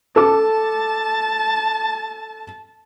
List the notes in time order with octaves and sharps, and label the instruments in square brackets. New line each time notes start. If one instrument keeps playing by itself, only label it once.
[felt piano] A4 D6 [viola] A5